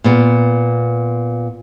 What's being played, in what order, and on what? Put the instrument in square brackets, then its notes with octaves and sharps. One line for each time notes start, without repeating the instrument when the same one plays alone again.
[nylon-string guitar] A#2 B3